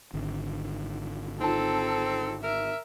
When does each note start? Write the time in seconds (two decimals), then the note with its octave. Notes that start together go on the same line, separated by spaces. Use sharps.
0.13 G#1 D3
1.41 C4 D#4 F4 A4 A5
2.44 A#4 E5